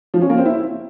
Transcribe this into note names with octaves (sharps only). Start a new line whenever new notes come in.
F3
C#4
A#3
C4
E4